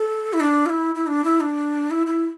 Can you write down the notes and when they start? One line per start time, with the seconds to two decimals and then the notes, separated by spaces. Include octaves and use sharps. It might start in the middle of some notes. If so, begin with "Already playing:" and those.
Already playing: A4
0.33 E4
0.40 D4
0.66 F4
0.70 E4
0.95 E4
1.07 D4
1.24 E4
1.40 D4
1.91 E4
2.06 E4